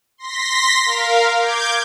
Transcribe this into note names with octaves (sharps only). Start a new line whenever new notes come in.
C6 A#6 B6
A#4 F5
D6 G6 G#6